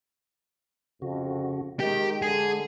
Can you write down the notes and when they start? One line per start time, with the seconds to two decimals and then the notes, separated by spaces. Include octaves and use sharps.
1.02 F2 C#3 F#4
1.80 D#3 G#3 G4
2.22 D3 G#4